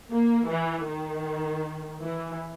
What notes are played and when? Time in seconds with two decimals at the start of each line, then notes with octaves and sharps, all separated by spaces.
0.11 A#3
0.49 E3
0.87 D#3
2.01 E3